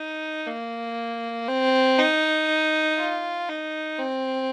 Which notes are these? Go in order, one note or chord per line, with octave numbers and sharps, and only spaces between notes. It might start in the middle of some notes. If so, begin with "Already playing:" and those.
Already playing: D#4
A#3
C4
D#4
F4
D#4
C4